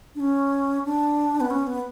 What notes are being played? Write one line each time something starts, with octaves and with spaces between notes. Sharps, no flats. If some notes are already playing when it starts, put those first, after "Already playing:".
D4
C#4
D4
B3
C#4
B3